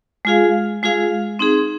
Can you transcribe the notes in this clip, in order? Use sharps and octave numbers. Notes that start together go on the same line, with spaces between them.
G#3 F4 G#4 F5
G#3 F4 G#4 F5
C4 D#4 G#4